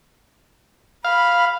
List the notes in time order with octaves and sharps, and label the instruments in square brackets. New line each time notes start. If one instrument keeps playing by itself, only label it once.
[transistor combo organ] F5 [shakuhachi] B5